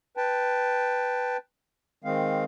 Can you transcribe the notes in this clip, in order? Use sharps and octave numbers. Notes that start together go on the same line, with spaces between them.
B4 G5 A5
D#3 G#3 C4 F5